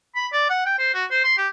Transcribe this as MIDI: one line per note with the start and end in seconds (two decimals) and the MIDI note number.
0.15 0.27 83
0.32 0.45 74
0.50 0.63 78
0.65 0.74 79
0.78 0.94 72
0.94 1.05 66
1.11 1.24 72
1.24 1.34 84
1.37 1.48 67